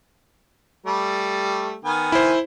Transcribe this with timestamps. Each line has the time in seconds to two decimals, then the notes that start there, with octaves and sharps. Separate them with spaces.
0.86 G3 A3
1.85 D#3 B3 G#5
2.12 E4 C5